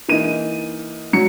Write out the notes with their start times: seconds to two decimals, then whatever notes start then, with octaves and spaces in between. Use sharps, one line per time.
0.08 E3 A#3 D#4 D#7
1.13 F#3 C#7